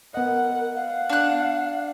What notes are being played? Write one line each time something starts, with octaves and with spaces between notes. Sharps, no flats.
B3 A#4 D#5 F#5
F5 F#5
D4 F#6